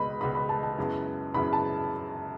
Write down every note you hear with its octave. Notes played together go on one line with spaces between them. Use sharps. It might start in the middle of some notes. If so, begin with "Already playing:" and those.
Already playing: C#2 B2 G#3 B3 D#5 B5
C#2 B2 G#3 B3 B5
B5
A5
A5
F#2 C#3 G#3 B3 E4
F#2 C#3 G#3 B3 E4 B5
A5